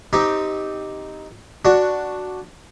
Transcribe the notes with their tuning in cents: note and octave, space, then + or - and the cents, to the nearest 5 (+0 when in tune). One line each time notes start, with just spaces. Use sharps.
C4 -15 D#4 +0 G4 +0
D4 +0 F#4 +0